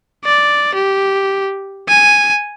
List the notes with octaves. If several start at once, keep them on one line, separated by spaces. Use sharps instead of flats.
D5
G4
G#5